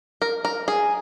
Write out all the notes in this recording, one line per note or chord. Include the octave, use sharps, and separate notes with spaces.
A#4
A#4
G#4